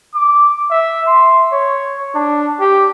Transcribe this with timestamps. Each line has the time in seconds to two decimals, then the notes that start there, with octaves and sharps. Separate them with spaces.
0.15 D6
0.71 E5
1.07 C6
1.52 C#5
2.15 D4
2.60 G4